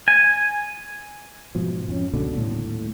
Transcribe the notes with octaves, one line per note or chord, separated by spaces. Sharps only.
G#5
G#2 B2 F3
F2 C#4
C#2 B2 D3
D#1 A2